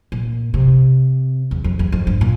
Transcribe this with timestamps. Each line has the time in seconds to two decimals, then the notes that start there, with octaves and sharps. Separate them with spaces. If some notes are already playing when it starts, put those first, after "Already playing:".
0.12 A#2
0.54 C3
1.51 E2
1.64 F2
1.79 E2
1.92 F2
2.07 G2
2.21 A#2